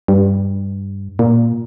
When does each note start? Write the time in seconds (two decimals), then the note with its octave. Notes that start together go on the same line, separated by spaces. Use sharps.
0.08 G2
1.19 A#2